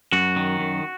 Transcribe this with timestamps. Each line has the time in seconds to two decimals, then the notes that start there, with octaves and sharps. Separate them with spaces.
0.13 F#2 F#4
0.36 D#3
0.60 F#2